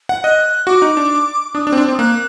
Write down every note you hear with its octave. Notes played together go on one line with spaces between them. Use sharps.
F#5
D#5 F#6
F#4 D6
D#4
D4
D4 D#6
D4 D6
C4
D4 C6
C4 D6
D#6
A#3 F#6